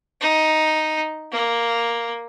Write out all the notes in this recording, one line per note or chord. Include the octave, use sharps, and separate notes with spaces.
D#4
A#3